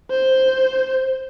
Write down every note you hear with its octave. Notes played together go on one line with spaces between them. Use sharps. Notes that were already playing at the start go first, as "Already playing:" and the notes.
C5